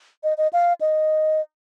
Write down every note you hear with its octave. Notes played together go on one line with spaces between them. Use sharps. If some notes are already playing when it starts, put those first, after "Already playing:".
D#5
D#5
F5
D#5